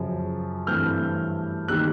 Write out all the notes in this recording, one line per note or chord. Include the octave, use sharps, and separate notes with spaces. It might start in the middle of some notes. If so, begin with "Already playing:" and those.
Already playing: F#2 C#3 F3
G2 E3 A3 C4 F6 G6
D#3 G3 A#3 E6 F#6